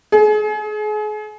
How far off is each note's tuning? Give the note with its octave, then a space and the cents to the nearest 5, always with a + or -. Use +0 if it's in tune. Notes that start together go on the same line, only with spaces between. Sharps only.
G#4 +35